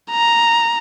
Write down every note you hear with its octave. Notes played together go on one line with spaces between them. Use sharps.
A#5